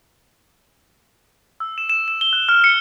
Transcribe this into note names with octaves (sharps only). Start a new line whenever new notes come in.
E6
E7
E7
E7
G7
F#6
F6
C#7